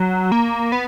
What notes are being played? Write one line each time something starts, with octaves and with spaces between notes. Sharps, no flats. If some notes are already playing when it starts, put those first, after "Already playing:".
Already playing: F#3
A#3
B3